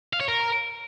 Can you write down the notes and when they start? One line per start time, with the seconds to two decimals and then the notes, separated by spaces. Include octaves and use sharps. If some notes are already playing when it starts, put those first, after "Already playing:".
0.13 F5
0.21 C#5
0.28 A#4